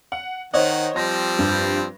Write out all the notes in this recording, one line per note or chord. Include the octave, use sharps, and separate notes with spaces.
F#5
D#3 C5 C#5 D#5 F#5
F3 G3 C4 A#6
G2